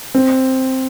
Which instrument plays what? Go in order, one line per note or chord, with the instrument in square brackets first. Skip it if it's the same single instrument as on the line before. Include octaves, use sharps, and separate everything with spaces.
[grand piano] C4